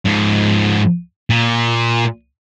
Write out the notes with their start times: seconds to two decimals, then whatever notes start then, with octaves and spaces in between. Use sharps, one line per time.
0.06 G#2 F3
1.30 A#2